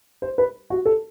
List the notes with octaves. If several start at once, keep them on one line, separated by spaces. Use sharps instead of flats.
C5
B4
F#4
A4